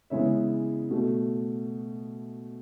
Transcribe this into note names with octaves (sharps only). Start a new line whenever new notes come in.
C#3 E3 G#3 B3 C#5 E5
B2 A3